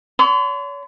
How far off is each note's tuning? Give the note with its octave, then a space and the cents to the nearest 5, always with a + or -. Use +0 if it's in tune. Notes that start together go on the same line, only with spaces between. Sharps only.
C#5 +40 C6 -45